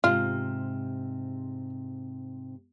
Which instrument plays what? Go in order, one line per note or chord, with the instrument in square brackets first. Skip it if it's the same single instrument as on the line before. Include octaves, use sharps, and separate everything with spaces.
[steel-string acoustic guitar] G#2 C3 [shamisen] F4 [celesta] F6